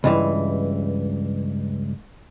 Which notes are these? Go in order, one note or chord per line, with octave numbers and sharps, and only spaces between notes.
C#2 G2 E3